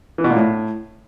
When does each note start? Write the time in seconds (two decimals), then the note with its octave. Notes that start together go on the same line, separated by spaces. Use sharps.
0.18 E3
0.24 B2
0.30 A#2
0.36 A2